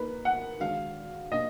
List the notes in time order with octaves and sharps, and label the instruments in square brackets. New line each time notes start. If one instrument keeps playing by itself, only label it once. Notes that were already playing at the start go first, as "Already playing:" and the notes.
Already playing: [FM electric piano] A#3 D#4 A#4 [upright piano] B4
[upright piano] F#5
[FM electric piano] D#3 G#3 D4 F#4 [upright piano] F5
[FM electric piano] B2 A#3 D4 [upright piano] D#5